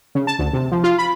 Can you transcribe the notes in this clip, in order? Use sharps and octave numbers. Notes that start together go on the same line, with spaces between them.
C#3
A5
D2
C3
F3
F4
B5